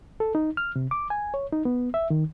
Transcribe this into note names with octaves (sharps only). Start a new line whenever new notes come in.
A4
D#4
F6
C3
D6
G#5
C#5
D#4
B3
E5
D#3